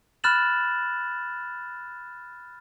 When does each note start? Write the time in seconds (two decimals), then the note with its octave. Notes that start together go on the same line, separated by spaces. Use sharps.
0.24 B5 F6 F#6 A6 E7 F#7